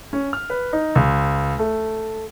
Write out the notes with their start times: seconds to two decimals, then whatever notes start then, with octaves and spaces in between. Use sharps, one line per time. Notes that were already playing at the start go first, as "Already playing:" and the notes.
0.13 C#4
0.33 F6
0.50 B4
0.73 D#4
0.95 C#2
1.59 A3